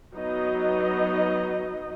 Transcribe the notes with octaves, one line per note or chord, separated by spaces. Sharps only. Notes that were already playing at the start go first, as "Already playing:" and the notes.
F#3 B3 D#4 D#5